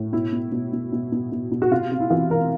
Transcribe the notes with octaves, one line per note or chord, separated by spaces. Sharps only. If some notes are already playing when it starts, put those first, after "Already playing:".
Already playing: A2
B2 E4
B2
B2
B2
B2
B2
B2
B2
F#4
C3 F4
C3
E4
E3 F4
E3 A#4